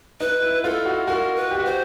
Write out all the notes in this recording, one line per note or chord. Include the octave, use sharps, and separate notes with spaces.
D#4 B4
E4
F4 A4
F#4
F#4 A#4
B4
G4
F#4
C5